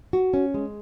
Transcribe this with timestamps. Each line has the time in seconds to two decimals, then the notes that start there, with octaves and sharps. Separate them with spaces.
0.13 F#4
0.34 C#4
0.54 G#3